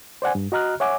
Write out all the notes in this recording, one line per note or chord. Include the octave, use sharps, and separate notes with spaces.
C5 D5 F#5 G#5
G2
F#4 D#5 A#5 F6 F#6
C#5 E5 F#5 G#5 D6